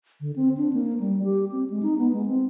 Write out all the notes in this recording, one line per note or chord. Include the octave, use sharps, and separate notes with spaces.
D3
C4
D4
A#3
G3
G4
C4
G#3
D#4
B3
G#3
C4